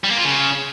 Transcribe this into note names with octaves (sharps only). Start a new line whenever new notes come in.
G3
A#3
F4
C#3